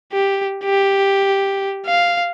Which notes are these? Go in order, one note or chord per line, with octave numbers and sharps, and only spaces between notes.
G4
G4
F5